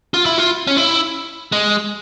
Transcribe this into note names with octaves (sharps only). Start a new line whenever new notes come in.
F4
E4
F4
C#4
E4
G#3